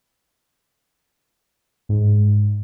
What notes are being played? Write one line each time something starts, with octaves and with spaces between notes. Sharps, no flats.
G#2